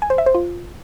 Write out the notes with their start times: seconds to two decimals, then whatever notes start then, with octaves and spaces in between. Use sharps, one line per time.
0.02 G#5
0.10 C5
0.18 E5
0.26 C5
0.35 F4